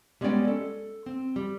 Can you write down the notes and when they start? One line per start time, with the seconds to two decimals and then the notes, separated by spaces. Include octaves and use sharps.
0.21 G3 G#3 B3 C#4 D5 G5
0.48 A4
1.06 C4
1.36 G3